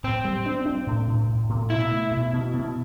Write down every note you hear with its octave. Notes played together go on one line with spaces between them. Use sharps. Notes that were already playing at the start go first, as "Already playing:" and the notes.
A2 C4
G3
D4
D4
A2
A2
A2
A2
B2 E4
A3
B2
B2
B2